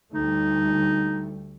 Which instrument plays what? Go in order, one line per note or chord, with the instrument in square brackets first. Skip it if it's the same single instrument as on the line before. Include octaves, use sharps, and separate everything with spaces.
[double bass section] D2 G3 A3 [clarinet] D#4